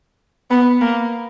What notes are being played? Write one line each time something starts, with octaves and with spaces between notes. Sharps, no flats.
B3
A#3